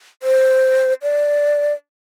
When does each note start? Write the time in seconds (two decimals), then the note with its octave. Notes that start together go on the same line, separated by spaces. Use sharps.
0.23 C5
1.02 D5